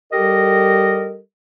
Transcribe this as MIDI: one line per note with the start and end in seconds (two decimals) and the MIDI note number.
0.13 1.18 55
0.13 1.18 67
0.13 1.18 69
0.13 1.18 70
0.13 1.18 75